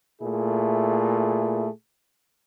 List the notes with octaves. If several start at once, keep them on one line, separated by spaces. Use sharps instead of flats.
A#2 A3 E4 G#4